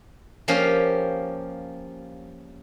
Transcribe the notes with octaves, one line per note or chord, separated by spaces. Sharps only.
F3 A#3 C#4 G4 F5